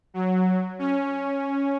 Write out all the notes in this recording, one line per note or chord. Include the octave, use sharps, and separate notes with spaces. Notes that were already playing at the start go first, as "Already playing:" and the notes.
F#3
C#4